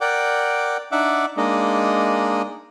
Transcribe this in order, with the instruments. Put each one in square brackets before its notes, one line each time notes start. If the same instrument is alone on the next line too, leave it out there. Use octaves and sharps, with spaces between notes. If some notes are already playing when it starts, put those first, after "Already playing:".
[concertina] A#4 D5 F#5 G5 D6
D4 D#4 E5 F#5 D6
G#3 A#3 D4 D#4 D#5